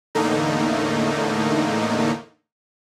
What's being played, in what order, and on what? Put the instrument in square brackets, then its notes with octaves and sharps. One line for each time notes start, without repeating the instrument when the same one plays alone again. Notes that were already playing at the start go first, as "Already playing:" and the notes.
[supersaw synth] E2 A2 D3 A3 A#3 D#4